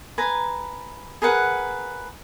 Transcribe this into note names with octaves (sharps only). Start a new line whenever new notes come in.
B4 G#5 A#5
G#4 A#4 B4 F#5